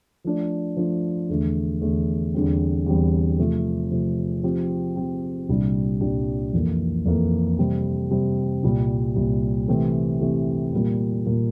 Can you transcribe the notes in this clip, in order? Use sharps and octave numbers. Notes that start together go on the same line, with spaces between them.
F3 A3 D4
F3 A3 D4
E2 D3 A3
E2 D3 A3
E2 D3 G3 C4
E2 D3 G3 C4
C3 F3 A3
C3 F3 A3
F3 C4 G4
F3 C4 G4
C2 A#2 G3 D4 G4
C2 A#2 G3 D4 G4
F2 E3 A#3
F2 E3 A#3
C3 G3 C4
C3 G3 C4
C2 A#2 G3
C2 A#2 G3
C3 E3 A3 C4 G4
C3 E3 A3 C4 G4
A#2 G3 A#3
A#2 G3 A#3